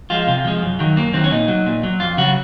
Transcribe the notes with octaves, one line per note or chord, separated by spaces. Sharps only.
F3 G#3 F4
C3 F4
F3 G#3
F#2
D#3 F#3
F#2 A#3
D#3 F#3 C4
C#4
A#2 D#4
F#3
A#2
F#3
F2 F4
C#3 F#3 F#4